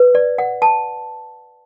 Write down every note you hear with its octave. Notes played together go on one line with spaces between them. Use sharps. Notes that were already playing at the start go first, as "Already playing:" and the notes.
Already playing: B4
D5
F#5
A5